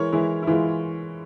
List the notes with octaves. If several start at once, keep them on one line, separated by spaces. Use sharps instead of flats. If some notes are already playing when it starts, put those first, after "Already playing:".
Already playing: E3 G#3 A#4 C#5
E3 G#3 E4
E4
E3 G#3 F4